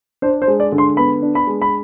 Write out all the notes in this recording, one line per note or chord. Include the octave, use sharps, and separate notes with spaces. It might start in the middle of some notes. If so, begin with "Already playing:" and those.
D4 C5
C5
G#3
D5
D3
C6
B3 B5
D4
B5
G#3
B5